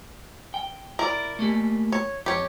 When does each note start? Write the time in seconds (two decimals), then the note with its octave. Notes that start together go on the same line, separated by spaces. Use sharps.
0.54 G5
0.99 E4 A#4 D5
1.39 A3 A#3 G4
1.92 C#5
2.26 F2 G4 C#5